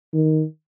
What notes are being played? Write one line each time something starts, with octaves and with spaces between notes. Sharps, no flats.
D#3